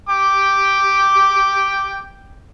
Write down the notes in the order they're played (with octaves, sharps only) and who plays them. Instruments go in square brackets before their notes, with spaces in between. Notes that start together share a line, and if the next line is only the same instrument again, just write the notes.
[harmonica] G5 D6